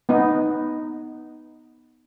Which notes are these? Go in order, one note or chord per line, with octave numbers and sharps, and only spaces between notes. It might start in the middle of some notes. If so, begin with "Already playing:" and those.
B3 D#4